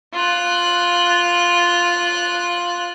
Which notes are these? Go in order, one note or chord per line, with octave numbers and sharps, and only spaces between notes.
F4 F#6